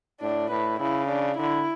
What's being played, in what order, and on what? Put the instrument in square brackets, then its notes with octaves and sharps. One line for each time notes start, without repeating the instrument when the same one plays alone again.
[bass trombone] A2 [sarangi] D4
[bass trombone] A2 [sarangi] B4
[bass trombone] C#3 [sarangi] E4
[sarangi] D4
[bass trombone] D3 [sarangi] E4